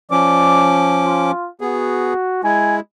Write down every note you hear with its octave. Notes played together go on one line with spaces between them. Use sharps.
F3 C#4 D5 D6
F4
B3 F#4 G#4
G#3 E4 G#5